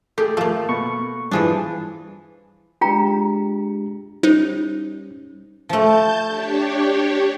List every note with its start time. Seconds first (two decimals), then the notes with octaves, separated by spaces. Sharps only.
0.18 A3 G4 G#4
0.37 F3 A3 A#3
0.69 B2 C#6
1.31 G2 E3 F3 D4 G#4
2.81 G#3 D4 F4 G4 G5 A#5
4.23 G3 C#4 D#4 C5
5.69 F3 A3 A5 G6
6.27 D4 G4 C#5